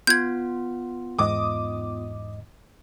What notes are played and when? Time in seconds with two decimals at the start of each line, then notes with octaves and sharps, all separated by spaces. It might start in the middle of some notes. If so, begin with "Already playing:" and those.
0.07 B3 F4 G6 G#6
1.19 E2 G#2 D#5 D6 D#6